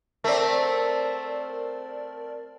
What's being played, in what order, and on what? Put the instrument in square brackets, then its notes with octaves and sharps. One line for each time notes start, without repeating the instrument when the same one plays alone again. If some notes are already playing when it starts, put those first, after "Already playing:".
[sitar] A3 C4 [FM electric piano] A#4 D5